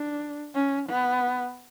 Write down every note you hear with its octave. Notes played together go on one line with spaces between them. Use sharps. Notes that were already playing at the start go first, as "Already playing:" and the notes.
Already playing: D4
C#4
B3